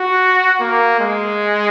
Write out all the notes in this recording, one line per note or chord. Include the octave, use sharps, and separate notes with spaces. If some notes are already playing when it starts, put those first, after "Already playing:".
Already playing: F#4
A#3
G#3